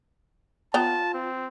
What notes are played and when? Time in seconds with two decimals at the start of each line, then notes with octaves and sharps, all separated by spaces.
0.74 B3 F4 G5 A5 A#5
1.14 C4